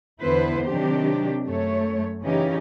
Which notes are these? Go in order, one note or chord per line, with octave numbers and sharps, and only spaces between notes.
E2 D3 B3 E4 B4 C5
C3 D#3 F#3 D4 G4
F#2 A3 C#5
C#3 E3 C#4 D#4 G4